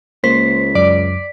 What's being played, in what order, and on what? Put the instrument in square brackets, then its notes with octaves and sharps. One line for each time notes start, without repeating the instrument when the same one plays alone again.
[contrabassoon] C#2 [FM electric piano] A#3 [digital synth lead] C5 [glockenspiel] B6
[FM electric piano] F#2 [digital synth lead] D5